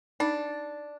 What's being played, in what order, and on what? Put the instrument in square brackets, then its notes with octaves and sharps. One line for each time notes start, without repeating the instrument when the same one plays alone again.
[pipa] D4 [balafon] D#4